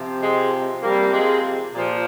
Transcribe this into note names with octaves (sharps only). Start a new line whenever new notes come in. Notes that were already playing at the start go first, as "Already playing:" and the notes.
Already playing: C3 F3
G#3
C3 F3 G3 A#3
G#3
A#2 F3